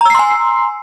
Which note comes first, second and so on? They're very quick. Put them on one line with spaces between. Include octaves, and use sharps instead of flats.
A#5 E6 C7 C6 G#5